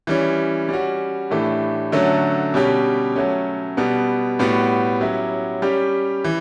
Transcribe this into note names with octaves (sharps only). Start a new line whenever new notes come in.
E3 G3 C#4
G3 C#4 F#4
A2 E3 A3 D4 G4
D3 F#3 A3 C#4
B2 G3 C#4 G4
F#3 A3 C#4
B2 G3 B3
A2 G3 B3 F#4
F#3 C#4 E4 G4
G3 C#4 G4
E3